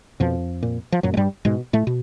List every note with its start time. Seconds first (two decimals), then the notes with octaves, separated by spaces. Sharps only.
0.20 F2 B2 F3
0.63 A#2
0.92 F3
1.03 F#2 A#2 F#3
1.14 G#3
1.17 G2 G3
1.45 G#2 B2 G#3
1.73 A2 A3
1.87 B2